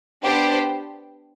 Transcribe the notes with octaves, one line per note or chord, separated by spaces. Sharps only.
B3 D4 G4 C5